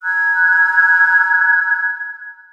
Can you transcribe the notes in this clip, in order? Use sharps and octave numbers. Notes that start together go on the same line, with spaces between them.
A#5 E6 F#6 G#6